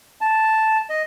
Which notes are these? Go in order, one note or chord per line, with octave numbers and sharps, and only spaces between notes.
A5
D#5